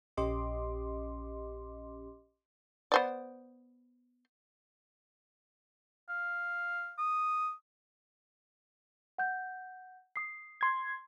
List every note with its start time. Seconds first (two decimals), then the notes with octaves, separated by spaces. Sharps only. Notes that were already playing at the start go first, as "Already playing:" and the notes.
0.17 A#1 C#4 G4 D#5 C6 D6
2.92 B3 C5 D5
6.09 F5
6.98 D#6
9.18 F#5 G6
10.16 D#6 C7
10.61 C6 G#6